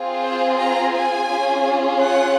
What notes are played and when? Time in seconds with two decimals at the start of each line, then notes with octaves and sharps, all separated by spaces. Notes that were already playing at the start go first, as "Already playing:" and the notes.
Already playing: C4 F4 G#4
0.25 C5
0.61 A#5
0.95 G#5
1.31 C#4 F4 G#4
2.02 F#5